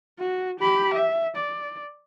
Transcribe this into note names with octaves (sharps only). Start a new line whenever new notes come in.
F#4
G4 B5
E5
D5